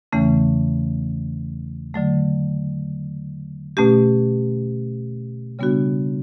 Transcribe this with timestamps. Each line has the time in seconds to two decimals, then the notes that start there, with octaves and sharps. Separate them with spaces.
0.12 E2 C#3 E3 A3 C#4
1.94 D3 F#3 A3
3.77 B2 A3 C#4 G4
5.59 C#3 G3 B3 D4 F#4